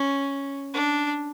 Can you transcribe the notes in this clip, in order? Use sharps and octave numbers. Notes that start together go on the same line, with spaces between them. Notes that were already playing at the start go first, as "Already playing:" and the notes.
Already playing: C#4
D4